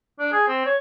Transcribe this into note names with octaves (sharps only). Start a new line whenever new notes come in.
D4
G#4
C4
C#5